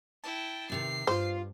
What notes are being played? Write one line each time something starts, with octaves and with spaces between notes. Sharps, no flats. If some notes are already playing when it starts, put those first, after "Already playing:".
E4 G5 A5
E2 C3 D#3 C7
G2 F4 C5 F5